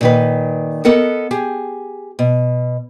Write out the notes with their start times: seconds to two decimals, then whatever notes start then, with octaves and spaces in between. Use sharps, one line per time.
0.01 A#2 D#3 B4
0.85 B3 A4 A#4 D#5 F#5
1.31 G4 G#4
2.19 B2